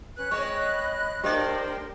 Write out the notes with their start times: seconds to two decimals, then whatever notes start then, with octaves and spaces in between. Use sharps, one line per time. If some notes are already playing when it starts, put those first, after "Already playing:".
0.17 C#4 B4 F#6
0.31 G#3 C4 C#5 D#5 B5 C#6
1.24 A3 D4 G4 A#4 C5 D5 D#5 G5